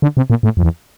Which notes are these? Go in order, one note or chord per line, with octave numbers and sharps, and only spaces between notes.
D3
C3
A#2
A2
F2
E2